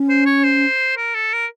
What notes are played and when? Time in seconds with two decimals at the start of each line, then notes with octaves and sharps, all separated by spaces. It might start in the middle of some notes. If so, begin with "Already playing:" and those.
Already playing: C#4
0.09 C5
0.26 C#5
0.44 C5
0.97 A#4
1.14 A4
1.33 A#4